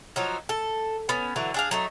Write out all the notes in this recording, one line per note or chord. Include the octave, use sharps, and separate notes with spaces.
F3 F#3 D#4
A4
B3 C#4
D3 E3 F#3
D4 G#4 F5
F#3 A3 D#4